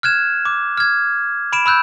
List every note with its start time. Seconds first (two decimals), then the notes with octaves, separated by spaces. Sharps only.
0.03 F6 F#6 G#6 E7
0.45 D6
0.77 F6 G#6
1.53 B5 D7 E7
1.66 B5 E6 F#6 G6